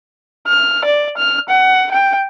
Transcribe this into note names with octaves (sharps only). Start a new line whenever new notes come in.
F6
D5
F6
F#5
G5